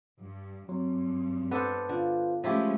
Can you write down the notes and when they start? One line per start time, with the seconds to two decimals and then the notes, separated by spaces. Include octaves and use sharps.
0.19 G2
0.69 G2 F#3 C4
1.51 B3 D4 A4 B4 C5
1.89 D3 F4 F5
2.44 F3 G#3 A3 C#4 E4 G4 G#4